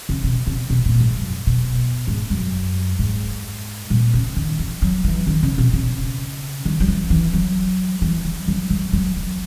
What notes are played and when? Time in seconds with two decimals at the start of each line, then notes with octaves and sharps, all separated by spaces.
0.09 C#3
0.24 B2
0.47 C#3
0.70 B2
0.85 A#2
1.00 G#2
1.16 F#2
1.47 B2
2.07 G#2
2.30 F#2
2.99 G#2
3.90 A#2
4.14 C#3
4.36 D#3
4.59 E3
4.82 F#3
5.04 E3
5.27 D#3
5.43 C#3
5.58 B2
5.73 C#3
6.65 D#3
6.80 F#3
6.88 E3
7.10 E3
7.33 F#3
8.02 E3
8.25 E3
8.48 F#3
8.70 E3
8.93 F#3
9.16 E3